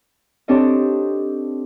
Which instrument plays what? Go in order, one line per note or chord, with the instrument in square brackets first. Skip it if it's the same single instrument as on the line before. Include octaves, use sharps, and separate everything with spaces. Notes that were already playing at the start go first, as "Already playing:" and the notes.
[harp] C4 D4 G4 A4 C#5 D#5